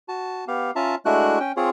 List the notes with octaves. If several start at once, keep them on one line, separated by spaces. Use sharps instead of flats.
F#4 A5
B3 G4 F5
C#4 F4 E5 A5 A#5
G#3 A3 D4 E4 F#4 F#6
C#4 G5
C4 F4 G#4 C#5